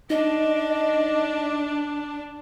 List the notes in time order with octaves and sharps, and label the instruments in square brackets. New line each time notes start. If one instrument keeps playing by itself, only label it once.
[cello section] D4 [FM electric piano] D#4 [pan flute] D#5